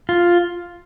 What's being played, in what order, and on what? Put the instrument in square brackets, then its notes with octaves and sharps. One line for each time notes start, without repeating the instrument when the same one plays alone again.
[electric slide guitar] F4